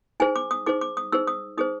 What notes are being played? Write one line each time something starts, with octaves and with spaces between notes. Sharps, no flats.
D#4 G#4 C5 G#5
D6
D#6
D#4 G#4 C5 D6
D6
D#6
D#4 G#4 C5 E6
D#6
D#4 G#4 C5 D#6